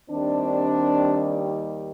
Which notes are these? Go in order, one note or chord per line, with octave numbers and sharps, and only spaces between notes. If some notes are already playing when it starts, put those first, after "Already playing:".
D#2 D#3 G3 C4 D4